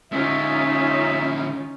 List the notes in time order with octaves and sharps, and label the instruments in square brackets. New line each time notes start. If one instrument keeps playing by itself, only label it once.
[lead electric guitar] D3 G#3 [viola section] C#4 D#4 F4 [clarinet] E5